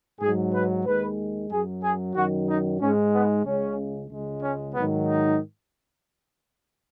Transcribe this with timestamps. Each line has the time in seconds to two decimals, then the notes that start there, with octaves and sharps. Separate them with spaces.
0.20 G#2 F#3 G#4
0.53 B4
0.85 D#2 D#3 G#3 B4
1.50 F#2 F#3 G#4
1.82 G#4
2.15 F#2 D#3 F#3 F#4
2.48 D#4
2.80 G#2 G#3 C#4
3.13 B3
3.45 C#2 C#3 G#3 C#4
4.10 C#2 C#3 G#3
4.42 C#4
4.75 G#2 D#3 F#3 B3
5.07 D#4